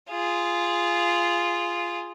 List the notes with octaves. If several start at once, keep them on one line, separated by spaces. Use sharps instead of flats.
F4 G#4